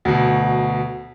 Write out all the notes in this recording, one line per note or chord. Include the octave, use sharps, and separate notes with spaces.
D2 B2